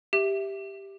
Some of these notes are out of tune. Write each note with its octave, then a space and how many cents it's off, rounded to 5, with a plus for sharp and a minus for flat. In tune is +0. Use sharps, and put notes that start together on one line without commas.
G4 +0 E5 +0